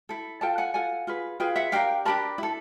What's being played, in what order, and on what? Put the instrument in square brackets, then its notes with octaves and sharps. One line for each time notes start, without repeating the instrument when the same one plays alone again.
[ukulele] E4 A4
F4 A4 G5 A5
F#5 G#5
F4 A4 F#5 G#5
F4 G#4 B4
F4 G#4 B4 F5 G5
E5 F#5
D4 G4 A#4 F5 G5
D4 G4 A#4 A5 B5
E4 A4